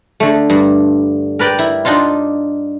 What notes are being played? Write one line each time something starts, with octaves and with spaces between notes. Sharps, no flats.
D3 A3
G2
A#4 B4 D5 G5
E4
D4 D#4 F4 C6